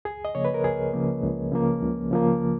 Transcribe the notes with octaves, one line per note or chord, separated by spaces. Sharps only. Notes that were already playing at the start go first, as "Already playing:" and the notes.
C#2 G#4
D#5
C#3 F3 A#3 C#5
B4
A#4
C#2 G#4
C#3 F3 A#3
C#2
C#3 F3 A#3
C#2
C#3 F3 A#3